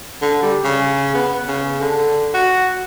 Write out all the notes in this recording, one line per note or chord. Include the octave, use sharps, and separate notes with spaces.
D3
G3
C#3
B3
C#3
D3
F#4